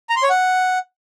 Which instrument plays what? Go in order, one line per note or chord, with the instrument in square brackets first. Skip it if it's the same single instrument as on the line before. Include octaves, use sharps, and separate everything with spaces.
[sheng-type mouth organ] A#5
C6
C#5
F#5